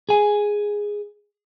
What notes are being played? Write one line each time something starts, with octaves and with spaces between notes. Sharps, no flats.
G#4 G#5